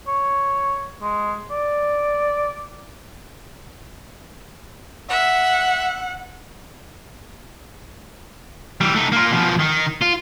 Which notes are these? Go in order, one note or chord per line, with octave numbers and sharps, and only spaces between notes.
C#5
G#3
D5
E5 F#5
E3 G3
A3 D#4
A#3 F4
B2 F3
D#3
F4